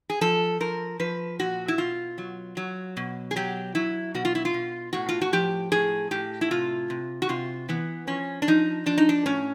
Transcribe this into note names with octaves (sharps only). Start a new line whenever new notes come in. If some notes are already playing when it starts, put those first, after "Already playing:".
G#4
F3 A4
F3 A#4
F3 B4
A#2 F#4
E4
B2 F4
F#3
F#3
B2
G#4
F#3 G4
F#3 E4
B2 F#4
F4
E4
F4
B2
A2 F#4
F4
F#4
F3 G4
A2 G#4
A2 G4
E4
C3 F4
C3
F#4
C3 F4
E3 B3
F3 C#4
D4
F3 D#4
F3 D4
D#4
D4
A2 C#4